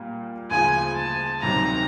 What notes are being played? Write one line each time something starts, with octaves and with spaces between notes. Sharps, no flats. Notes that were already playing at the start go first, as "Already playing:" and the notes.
Already playing: A#2 G3 A#3
D2 C#3 F3 G#5
A5
D2 C3 D#3 F#3 A#5